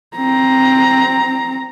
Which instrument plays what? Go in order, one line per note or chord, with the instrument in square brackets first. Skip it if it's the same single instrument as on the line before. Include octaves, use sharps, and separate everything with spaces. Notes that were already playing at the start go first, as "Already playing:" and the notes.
[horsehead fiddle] C4 A#5